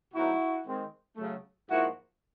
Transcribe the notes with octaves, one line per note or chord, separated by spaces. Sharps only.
B2 F#3 A3 C4 D#4 E4 F#4
D#3 G#3 C4
C#3 F#3 A3
G#2 F3 A#3 E4 F#4